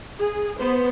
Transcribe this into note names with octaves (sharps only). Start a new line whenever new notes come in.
G#4
B3 C5